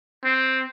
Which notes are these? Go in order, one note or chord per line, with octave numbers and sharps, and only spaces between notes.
C4